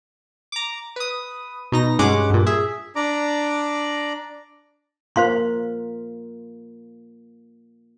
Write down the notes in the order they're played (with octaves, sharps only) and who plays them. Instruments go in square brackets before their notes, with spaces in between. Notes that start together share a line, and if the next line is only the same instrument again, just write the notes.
[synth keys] A#5 D6
B4 D#6
B2 D#4 A#6
G2 G#3 C#4 F#5 D6
G2 A#2
G#4 E5
[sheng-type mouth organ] D4 D5 A#5 D6
[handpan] A#3 F4 A#4 [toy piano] C5 F5 C6